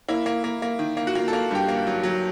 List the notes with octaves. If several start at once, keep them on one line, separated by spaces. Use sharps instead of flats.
A#3 E4
A#3
A#3
A#3
D#3
A#3
F#4
A#3 F4
A4
A#3
G2 G4
A#3
F#3
F#3